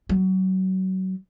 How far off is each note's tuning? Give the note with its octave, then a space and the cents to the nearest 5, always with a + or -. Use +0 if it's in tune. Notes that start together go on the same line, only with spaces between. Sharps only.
F#3 +30